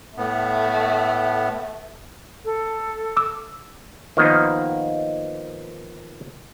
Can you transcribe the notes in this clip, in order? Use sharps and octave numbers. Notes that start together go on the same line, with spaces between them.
A2 A3 B3
A4
D6 E6
D#3 F3 A#3 B3 D#4